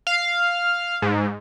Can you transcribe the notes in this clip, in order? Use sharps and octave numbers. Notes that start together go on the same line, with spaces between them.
F5
G#2